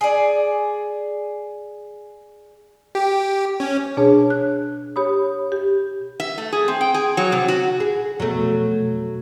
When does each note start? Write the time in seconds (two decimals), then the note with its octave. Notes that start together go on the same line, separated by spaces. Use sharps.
0.01 G#4 D5
2.95 G4
3.60 C#4
3.97 B2 D4 G#4 C#5 A5
4.30 F#6
4.96 G4 C#5 B5 D#6
5.52 G4
6.20 E5
6.38 A3
6.52 G#4
6.68 C4
6.81 G5
6.94 G#4
7.17 F#3
7.32 C3
7.48 F#4
7.80 G#4
8.20 F2 B2 F#3 A3